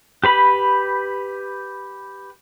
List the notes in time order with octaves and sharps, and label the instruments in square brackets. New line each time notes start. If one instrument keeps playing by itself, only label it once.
[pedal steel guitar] G4 B4 B5